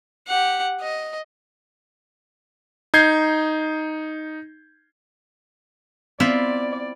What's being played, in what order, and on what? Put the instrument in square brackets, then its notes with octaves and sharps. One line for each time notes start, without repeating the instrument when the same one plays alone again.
[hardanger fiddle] G4 F#5
D#5
[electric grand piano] D#4 G6 G#6 C7
[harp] B3 C4 [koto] E4 F4 E5 [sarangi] D5